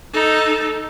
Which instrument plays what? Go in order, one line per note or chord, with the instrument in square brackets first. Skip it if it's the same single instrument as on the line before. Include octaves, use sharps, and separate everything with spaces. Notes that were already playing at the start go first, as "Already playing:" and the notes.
[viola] D#4 A4